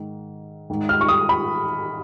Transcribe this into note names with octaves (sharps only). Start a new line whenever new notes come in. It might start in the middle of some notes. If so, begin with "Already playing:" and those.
Already playing: G#2 D#3
G#2 D#3
F6
C#6
D#6
B5